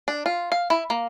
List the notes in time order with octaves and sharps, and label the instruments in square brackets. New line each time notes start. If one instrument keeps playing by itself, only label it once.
[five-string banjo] D4
F4
F5
E4
A#3